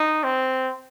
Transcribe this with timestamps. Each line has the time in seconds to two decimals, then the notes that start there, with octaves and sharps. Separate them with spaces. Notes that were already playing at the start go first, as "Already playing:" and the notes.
Already playing: D#4
0.24 C4